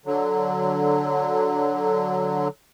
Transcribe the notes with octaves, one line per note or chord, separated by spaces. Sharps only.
D3 F#3